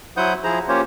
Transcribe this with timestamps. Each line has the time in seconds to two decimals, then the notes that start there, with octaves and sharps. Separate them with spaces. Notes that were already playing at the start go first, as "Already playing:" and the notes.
0.17 F#3 E4 C5 F#5 D#6 G6
0.44 F3 E4 G#4 C5 A#5
0.68 A#3 C#4 F4 G4 C5 C#5